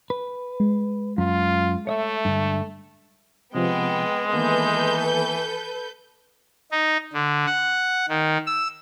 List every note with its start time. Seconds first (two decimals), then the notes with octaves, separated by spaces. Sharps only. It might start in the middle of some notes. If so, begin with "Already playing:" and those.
0.10 B4
0.60 G#3
1.18 F#2 F4
1.87 A3 C#5 D#5 E5
2.25 G2 D3
3.55 C3 F3 G#3 B3 G5
4.33 D#3 E3 A#3 B3 A4 B4 G6
6.72 D#4
7.13 D3
7.46 F#5
8.09 D#3
8.47 E6